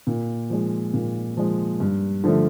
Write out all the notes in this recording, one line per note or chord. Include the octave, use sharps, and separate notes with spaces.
A#2
F3 G#3
A#2
F3 G#3
G2
D3 F3 A3